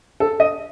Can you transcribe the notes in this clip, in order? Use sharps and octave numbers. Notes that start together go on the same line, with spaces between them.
A4
D#5